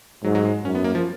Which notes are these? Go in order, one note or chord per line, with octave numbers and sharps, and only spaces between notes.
G#2 F#3
F#3
G#3
F#2 C#4
B3
A#3
F3